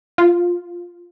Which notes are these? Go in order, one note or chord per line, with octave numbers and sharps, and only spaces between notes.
F4